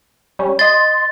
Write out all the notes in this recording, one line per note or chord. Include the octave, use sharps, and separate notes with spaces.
G3 C#4
D#5 C6 A6